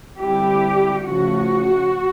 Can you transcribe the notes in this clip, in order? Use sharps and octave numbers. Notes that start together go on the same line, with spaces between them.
D3 G3 C4 E4 G4
C#3 F3 A3 C#4 F#4